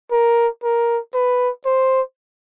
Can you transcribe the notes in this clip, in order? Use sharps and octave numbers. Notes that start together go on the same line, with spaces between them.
A#4
A#4
B4
C5